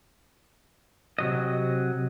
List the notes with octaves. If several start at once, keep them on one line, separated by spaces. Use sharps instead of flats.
C3 F#3 D#5